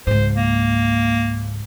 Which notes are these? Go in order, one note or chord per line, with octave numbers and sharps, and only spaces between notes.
C#2 G#2 C5
A#3